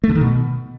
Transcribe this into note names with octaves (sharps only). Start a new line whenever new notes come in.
A3
D3
D#3
B2